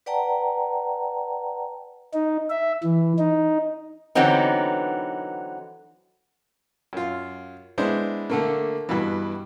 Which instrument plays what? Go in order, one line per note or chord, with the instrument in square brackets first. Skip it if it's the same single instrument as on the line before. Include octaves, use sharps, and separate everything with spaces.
[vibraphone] B4 D5 F#5 G5 A5 A#5
[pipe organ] D#4
E5
E3
D#4
[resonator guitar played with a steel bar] D3 E3 F#3 B3 C4 D#4
[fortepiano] F#2 F4
G#3 B3 D4 E4 C5
D3 A3 A#3
G2 B2 E3